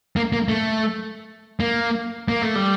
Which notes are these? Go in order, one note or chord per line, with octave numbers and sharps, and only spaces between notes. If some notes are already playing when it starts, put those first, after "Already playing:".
A#3
A#3
A3
A#3
A#3
A3
G3